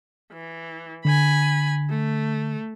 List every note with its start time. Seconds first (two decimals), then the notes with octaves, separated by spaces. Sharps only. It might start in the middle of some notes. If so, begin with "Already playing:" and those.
0.33 E3
1.05 D3 G#5 B5
1.89 A3